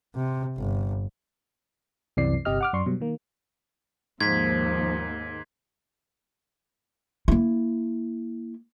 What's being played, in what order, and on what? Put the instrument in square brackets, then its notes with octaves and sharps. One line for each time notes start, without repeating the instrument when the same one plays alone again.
[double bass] C3
G1
[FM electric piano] C2 F#2 C3 E3 D5 C7
G1 C3 G4 D#5 F6
F#5 D6 F6
F#2 D5 C6 C#6
B2 F#3 G3
D#3 A#3
[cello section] D#2 [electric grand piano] G#2 [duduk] F3 [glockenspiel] G#6 B6
[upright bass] A#3 E4